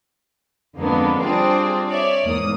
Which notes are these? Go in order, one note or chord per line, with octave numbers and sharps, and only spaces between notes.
F2 D3 G#3 A#3 B3 D4
G3 C4 D4 F4 G#4 D5
C#5 D5 E5
E2 G#2 A#3 D#6